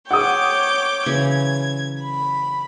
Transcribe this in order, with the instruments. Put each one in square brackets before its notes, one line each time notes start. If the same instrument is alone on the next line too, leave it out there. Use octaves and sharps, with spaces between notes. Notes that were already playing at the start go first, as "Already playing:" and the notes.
[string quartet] C#5 G5 D6 [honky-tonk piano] F#5 D#6
[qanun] C#3 E3 F#3 [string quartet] G#6
[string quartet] B5